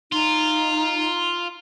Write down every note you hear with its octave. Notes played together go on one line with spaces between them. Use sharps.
D#4 F4